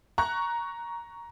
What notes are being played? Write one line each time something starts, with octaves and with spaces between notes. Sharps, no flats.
A#5 C#6 F#6